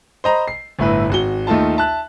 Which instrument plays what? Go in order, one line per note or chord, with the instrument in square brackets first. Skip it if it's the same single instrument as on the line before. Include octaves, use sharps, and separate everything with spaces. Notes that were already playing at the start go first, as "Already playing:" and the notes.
[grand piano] C5 D#5 A#5 B5
C7
G1 A2 E4 B4
G#1 F#4 G7
D#2 A3 D#4 F4 A5
E5 A5 F#6